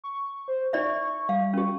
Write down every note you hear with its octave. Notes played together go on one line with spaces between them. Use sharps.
C#6
C5
D#4 D5 E5 C#6
G3 F5
C#4 G4